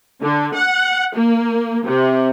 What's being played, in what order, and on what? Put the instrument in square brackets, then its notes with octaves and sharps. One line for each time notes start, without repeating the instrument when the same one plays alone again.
[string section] D3
F#5
A#3
C3